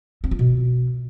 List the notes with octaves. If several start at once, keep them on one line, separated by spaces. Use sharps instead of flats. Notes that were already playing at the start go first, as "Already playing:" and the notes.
C4
F4
B2